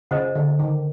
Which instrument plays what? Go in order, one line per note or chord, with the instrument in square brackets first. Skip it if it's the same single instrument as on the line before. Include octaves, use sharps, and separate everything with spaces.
[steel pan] C#3 [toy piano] C5 D#5 F#5
[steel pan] D3
D#3